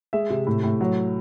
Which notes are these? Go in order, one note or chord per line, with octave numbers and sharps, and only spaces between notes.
G#3 E5
C3
A2
A2
F#3